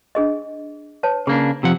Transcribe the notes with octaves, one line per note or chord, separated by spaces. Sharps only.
D4 G#4 D#5
B4 C#5 A5
C#3 A#3 D4 G#4
C3 F3 F#5